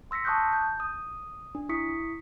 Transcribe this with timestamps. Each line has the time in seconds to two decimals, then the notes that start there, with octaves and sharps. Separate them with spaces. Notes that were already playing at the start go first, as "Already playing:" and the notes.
0.11 C6 E6 A#6 B6 C#7
0.25 A5 C#6 D#6 F#6 G6
0.53 G6
0.80 D#6
1.55 D4
1.69 E4 C#6 D#6 B6 C#7